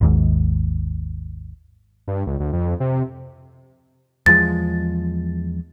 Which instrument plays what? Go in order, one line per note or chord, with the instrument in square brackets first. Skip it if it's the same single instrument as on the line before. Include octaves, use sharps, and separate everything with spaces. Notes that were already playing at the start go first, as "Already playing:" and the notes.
[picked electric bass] G#1 D#2 G#2
[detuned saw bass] G2
C#2
D2
F2
C3
[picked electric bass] E2 F3 G#3 [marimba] A6